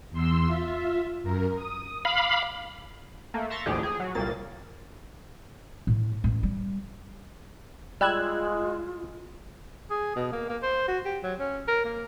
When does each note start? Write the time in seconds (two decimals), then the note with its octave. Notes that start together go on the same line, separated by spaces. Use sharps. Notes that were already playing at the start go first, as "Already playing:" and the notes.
0.11 E2 C6 E6
0.45 F4 E5
1.23 F#2 A#4
1.56 D#6
2.05 F5 B5 D6
3.34 A3 A#3
3.50 E5 A#5 C6 C#6 A6 A#6
3.66 A1 D#2 A2 F3 G4 G#4
3.83 G#4
4.00 F#3
4.15 C2 A#2 A#3 A6
5.87 A2
6.24 A1
6.43 G3
8.01 G3 G#3 F4 E6 F#6 G#6
9.90 G#4
10.15 B2
10.32 A#3
10.49 A#3
10.63 C5
10.88 F#4
11.05 G4
11.23 F#3
11.39 C#4
11.68 A#4
11.85 A#3